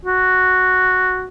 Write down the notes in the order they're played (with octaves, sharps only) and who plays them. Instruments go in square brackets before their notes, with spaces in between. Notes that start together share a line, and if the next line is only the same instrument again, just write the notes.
[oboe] F#4